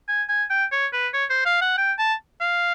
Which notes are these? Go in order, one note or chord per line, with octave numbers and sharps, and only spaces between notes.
G#5
G#5
G5
C#5
B4
C#5
C5
F5
F#5
G5
A5
F5